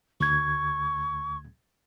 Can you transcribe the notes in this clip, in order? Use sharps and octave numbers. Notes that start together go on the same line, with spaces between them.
D2 C#6 G#6